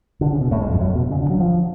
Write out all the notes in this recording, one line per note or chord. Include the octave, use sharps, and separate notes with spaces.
D3
C#3
B2
A2
G#2
F2
F#2
B2
C#3
D3
F#3
F3